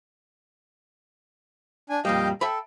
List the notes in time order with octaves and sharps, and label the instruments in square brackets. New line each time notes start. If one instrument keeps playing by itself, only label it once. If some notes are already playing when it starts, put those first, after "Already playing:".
[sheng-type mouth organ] D4 G#5
[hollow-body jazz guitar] F2 A#2 G3 [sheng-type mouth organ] D#5 F5 G5
[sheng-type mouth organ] A4 [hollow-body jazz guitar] E5 G5 B5